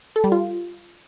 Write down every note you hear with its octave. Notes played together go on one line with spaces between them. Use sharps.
A4
G3
F4